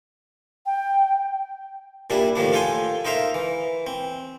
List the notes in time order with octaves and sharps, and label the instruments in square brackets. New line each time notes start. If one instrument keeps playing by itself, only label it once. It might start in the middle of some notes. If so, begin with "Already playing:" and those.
[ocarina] G5
[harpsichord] A#2 G3 D4 E4
A2 D#3 F3 D4
F4 A4 G5 G#5 C6
D#4 A#4 C5 E5 F5
E3
C4